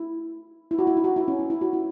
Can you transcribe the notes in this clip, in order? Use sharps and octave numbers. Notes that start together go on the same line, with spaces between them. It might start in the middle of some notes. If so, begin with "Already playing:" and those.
Already playing: E4
E4
F#4
E4
D#4
F#4
E4
C#4
D#4
E4
F#4
E4